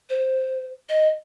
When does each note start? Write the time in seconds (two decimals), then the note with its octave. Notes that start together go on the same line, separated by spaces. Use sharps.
0.10 C5
0.89 D#5